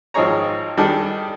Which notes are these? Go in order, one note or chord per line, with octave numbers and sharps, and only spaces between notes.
G#1 F3 D#4 G#4 C#5 A#5
D#3 G3 D4 G#4 A4 D#5